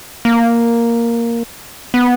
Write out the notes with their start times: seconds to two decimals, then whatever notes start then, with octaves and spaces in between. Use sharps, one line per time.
0.25 A#3
1.94 B3